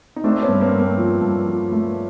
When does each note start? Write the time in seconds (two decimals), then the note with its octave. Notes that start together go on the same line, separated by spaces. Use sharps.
0.16 D#4
0.24 A3 C4 D4
0.42 B3 C#4
0.49 G2
0.60 A#3 C4
0.73 G2
0.79 A#3 C4
0.98 F3
1.22 G2
1.46 F3
1.72 A3